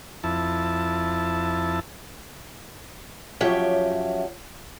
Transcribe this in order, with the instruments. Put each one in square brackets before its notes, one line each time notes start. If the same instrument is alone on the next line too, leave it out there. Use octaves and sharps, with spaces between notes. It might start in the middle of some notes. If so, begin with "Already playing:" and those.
[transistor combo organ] F2 E4 A5
[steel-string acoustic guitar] F#2 F3 G4 C#5 E5 G5